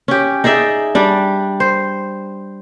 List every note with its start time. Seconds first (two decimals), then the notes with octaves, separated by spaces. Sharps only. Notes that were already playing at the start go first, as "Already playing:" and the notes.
0.08 C#4 G4
0.44 D#4 G#4 D5 E5
0.95 G3 D4
1.60 C5